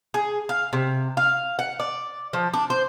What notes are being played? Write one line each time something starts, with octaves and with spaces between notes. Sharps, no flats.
G#4
F5
C3
F5
F#5
D5
F3
D4
C5